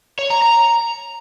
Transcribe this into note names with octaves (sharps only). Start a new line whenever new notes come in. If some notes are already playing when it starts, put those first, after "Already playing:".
C#5
A#5
A#5